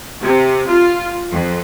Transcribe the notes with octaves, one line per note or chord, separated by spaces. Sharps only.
C3
F4
F2